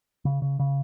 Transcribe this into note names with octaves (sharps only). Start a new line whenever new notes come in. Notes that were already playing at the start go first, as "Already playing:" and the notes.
C#3
C#3
C#3